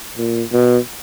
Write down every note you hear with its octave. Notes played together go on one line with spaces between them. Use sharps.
A#2
B2